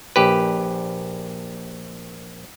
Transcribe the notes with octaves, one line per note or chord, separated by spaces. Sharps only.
A#1 G4 B4